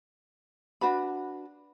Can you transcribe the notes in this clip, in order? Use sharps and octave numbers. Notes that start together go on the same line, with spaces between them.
D4 F#4 B4 B5